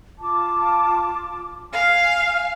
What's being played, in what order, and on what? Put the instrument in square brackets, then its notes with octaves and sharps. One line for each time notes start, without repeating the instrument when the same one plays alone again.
[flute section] F4 A5 D6
[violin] F5 [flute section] G#5 F6